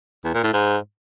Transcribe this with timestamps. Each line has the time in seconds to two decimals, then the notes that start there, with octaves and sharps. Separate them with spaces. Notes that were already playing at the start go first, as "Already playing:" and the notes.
0.25 E2
0.34 A#2
0.44 A2
0.53 G#2